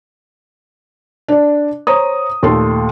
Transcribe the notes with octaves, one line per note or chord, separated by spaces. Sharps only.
D4 D5
C5 C#5 A#5 D#6
D#2 A#2 A3 A4 C6